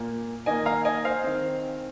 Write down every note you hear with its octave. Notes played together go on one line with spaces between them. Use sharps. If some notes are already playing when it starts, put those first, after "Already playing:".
Already playing: A#2 A#3
D#3 A#3 D#5 G#5
F5 A#5
D#5 G#5
C5 F5
D#3 C4